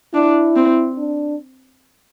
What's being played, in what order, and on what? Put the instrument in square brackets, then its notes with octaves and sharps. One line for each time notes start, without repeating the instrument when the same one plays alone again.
[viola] D4 [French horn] E4
[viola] C4
[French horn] D4